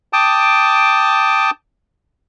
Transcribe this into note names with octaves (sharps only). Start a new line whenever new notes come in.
G5 A5 D6 D#6